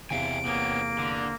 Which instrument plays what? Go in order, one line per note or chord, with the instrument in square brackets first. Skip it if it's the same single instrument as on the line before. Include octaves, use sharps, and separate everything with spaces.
[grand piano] E2 C3 [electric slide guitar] E5 F5 G#5 [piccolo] D7
[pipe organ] A#3 [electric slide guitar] B3 C#4
[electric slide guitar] D3